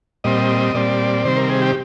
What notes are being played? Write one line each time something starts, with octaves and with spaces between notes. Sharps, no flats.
A#2 G3 C4 D#5
A#2 G3 C4 D5
C3 D#3 G3 C4 C5
A#4
G#4
G4